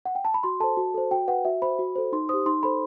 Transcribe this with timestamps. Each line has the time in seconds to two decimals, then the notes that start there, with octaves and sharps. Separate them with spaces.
0.06 F#5
0.15 G5
0.25 A5
0.34 B5
0.43 F#4 C6
0.60 A4 C5 A5
0.77 F#4
0.94 A4 C5
1.11 F#4 G5
1.28 B4 F#5
1.45 F#4 E5
1.62 C5 B5
1.79 F#4
1.96 A4 C5
2.12 D#4 C6
2.29 G4 C5 D#6
2.46 D#4 C6
2.63 A4 C5 B5